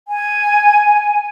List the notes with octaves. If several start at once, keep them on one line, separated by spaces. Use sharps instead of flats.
G#5